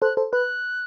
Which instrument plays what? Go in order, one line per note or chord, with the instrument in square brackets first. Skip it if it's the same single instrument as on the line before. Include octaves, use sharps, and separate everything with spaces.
[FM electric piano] A4 C5 [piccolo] F#6
[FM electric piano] A4 C5
[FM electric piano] B4 [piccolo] F#6